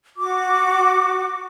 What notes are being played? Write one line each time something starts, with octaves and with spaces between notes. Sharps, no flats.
F#4 D6